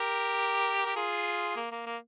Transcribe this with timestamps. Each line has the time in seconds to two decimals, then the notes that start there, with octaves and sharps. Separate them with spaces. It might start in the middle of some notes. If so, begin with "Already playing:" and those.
Already playing: G4 A#4
0.86 G4
0.96 F4 G#4
1.56 A#3
1.72 A#3
1.86 A#3